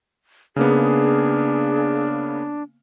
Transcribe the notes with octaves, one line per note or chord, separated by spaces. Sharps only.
C#3 A#3 B3 D4 G#4